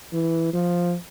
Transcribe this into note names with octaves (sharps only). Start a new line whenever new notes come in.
E3
F3